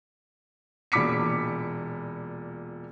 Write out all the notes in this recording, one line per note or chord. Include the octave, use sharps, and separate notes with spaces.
E1 A#2 B5 D6 B6 C#7